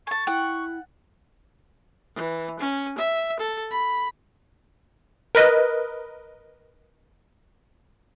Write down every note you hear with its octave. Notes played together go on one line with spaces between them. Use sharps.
G#5 A5 C#6
E4 F#5 G5
E3
C#4
E5
A4
B5
A#4 B4 D#5